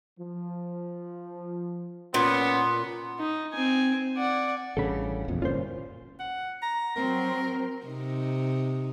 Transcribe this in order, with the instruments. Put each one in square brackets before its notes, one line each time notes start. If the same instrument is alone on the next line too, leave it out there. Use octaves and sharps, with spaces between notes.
[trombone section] F3
[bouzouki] A#2 [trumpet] B3 [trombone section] C#4
[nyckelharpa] D#4
C4 G#5
D5 F#5
[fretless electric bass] A1 G2 C#3 [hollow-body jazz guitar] A4 B5
[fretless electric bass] E1 A#1 F2
[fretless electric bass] G1 A#2 C#4 [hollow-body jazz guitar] F4 C5
[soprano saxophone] F#5
A#5
[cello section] F#3 C4 [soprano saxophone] A#4
[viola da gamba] C3 D#4